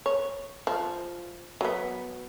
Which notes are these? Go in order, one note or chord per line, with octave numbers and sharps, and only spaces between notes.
C#5
F3
F#3 B3